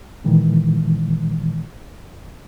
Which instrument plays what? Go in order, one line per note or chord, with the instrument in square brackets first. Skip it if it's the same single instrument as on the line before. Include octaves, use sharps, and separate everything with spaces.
[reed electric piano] A#2 D#3 E3 G#3